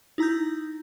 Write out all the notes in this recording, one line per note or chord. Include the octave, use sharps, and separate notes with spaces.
D#4 E4 A#5 D#6 G6